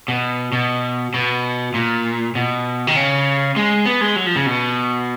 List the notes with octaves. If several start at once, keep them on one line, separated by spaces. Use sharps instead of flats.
B2
B2
B2
A#2
B2
D#3
C#3
G#3
B3
G#3
F#3
F3
C#3
B2